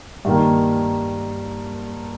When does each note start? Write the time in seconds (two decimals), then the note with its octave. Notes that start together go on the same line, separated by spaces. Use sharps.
0.25 G2 D#3 A#3